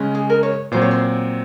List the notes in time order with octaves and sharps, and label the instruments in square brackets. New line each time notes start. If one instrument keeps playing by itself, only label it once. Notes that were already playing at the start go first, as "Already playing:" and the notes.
Already playing: [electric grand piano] C#3 G#3 C#4
[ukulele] G#4
A#4
C#5
[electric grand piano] A#2 F#3 C4 [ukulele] C5
[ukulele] C#5
C5